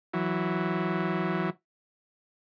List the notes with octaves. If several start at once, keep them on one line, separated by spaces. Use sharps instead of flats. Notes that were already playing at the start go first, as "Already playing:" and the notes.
E3 F#3